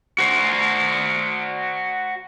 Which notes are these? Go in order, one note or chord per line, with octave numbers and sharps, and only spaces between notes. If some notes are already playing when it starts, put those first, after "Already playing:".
F#4 C5